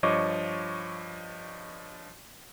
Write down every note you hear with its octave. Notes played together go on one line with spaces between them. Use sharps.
G2 F3 C#5 D#5 C#6 D6